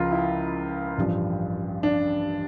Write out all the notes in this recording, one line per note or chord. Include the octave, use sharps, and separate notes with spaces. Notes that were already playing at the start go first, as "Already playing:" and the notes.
Already playing: C#2 C#3 F3 F4 A#4
E4
A1 G2 F3
D4